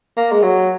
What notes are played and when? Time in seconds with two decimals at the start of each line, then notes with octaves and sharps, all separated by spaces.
0.17 A#3
0.32 G#3
0.43 F#3